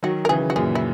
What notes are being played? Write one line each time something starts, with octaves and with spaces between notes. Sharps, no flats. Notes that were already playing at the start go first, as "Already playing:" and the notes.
D#3 F#3 F#4
A#4
C#3 E3 G#4
F#4
F#2 A#2 G#4
E4